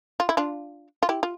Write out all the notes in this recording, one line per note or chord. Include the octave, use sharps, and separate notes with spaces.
F4
E4
D4 F4
F4
E4 G4
F4